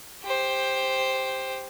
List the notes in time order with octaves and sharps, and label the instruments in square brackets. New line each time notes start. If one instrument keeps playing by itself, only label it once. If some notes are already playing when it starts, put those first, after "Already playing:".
[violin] G4 C5